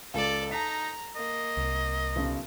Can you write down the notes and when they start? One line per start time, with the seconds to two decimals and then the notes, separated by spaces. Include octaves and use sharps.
0.14 C#2 A4 D5
0.51 D#4 A5 A#5 B6
1.16 A#3 D#5
1.57 C2
2.16 B1 C#3